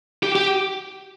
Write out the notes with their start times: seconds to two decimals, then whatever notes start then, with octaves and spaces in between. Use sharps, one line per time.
0.23 G4
0.36 G4